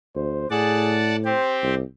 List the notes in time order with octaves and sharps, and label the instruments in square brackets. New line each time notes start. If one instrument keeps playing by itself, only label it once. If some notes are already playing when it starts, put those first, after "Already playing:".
[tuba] D2 [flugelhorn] C5
[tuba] A2 [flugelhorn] G#4 [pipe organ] D5 F#5 A5
[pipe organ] C4 G4 [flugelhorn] C5
[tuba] C2